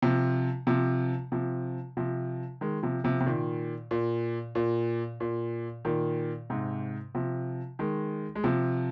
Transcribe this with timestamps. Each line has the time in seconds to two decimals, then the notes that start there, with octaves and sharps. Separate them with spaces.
0.02 C3 F3
0.67 C3 F3
1.32 C3 F3
1.97 C3 F3
2.61 D#3 G#3
2.83 C3 F3
3.04 C3 F3
3.20 C3
3.26 A#2 D#3
3.91 A#2
4.55 A#2
5.20 A#2
5.85 A#2 D#3
6.50 G#2 C3
7.15 C3 F3
7.79 D#3 G#3
8.35 G#3
8.44 C3 F3